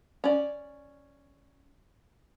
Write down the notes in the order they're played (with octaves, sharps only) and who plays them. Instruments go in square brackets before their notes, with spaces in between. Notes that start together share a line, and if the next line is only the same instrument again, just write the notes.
[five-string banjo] C#4 D5